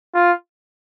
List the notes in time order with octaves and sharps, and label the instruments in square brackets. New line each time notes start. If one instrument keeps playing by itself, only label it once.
[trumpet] F4